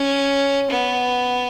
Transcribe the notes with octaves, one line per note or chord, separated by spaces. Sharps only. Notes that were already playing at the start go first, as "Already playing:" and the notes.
Already playing: C#4
B3